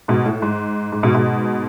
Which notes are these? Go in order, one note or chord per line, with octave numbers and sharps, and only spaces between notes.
G#2 B2
A2
G#2
G#2
G#2 B2
G#2 B2